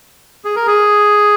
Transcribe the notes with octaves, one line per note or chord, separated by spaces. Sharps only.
G#4
A#4
G#4